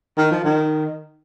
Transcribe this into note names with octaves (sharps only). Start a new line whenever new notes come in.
D#3
F3
D#3